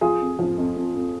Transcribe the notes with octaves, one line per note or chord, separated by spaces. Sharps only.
F3 F4 G#4
F2
F3
F2
F2
F2